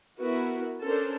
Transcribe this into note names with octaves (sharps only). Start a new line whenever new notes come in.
B3 E4 F#4 A#4 B4
C#4 D4 A4 A#4 C5